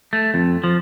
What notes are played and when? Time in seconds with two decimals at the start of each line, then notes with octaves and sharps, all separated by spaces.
0.13 A3
0.34 F2
0.64 F3